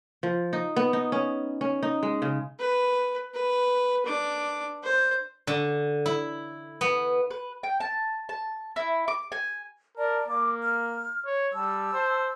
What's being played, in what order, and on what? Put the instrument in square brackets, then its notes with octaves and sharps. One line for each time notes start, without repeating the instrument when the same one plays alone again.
[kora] F3
D#4
B3
D#4
C#4
C#4
D#4
G#3
C#3
[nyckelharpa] B4
B4
D4 D6
C5
[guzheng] D3
E4
B3
[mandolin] B4
G5
A5
A5
E4
D6
G#5
[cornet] A#4 [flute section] D5 A5
[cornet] A#3 [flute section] D6
[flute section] F6
[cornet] C#5
[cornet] G3 [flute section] A5 E6
[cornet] C5